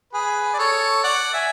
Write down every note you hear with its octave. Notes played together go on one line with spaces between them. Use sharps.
G#4 B4
D5
A4 C#5
D5 F#5
E5 G#5